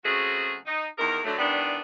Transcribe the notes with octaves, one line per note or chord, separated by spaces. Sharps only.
C#3 F#3 A3 C4 F#4 G#4
D#4
E2 D#3 G#4 A#4
D3 F#3 A3
D#3 E3 G3 B3 D4